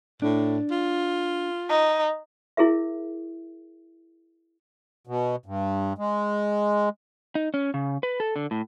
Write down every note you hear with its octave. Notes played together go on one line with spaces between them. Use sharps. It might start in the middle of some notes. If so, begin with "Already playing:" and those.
A2 D4
F4
D#4
E4 G#4 A#4 E5
B2
G2
G#3
D#4
C#4
C#3
B4
A4
D3
A2